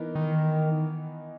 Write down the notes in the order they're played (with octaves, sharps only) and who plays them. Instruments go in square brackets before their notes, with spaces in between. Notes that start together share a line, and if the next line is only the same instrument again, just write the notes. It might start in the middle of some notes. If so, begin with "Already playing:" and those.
Already playing: [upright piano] E3 B3 D#4 A#4
[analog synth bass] D#3